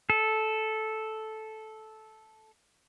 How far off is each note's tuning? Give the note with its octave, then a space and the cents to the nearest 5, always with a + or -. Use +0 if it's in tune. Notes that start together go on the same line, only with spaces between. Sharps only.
A4 -10